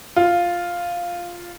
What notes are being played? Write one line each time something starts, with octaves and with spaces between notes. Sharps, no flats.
F4